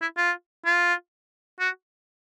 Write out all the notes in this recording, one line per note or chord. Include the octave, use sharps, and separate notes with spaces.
E4
F4
F4
F#4